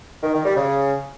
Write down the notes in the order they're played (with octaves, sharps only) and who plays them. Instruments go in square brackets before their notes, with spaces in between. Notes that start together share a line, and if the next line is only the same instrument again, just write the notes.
[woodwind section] D#3
D#3
G3
C#3